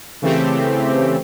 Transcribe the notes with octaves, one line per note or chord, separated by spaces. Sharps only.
C#3 E3 A3 C4 G4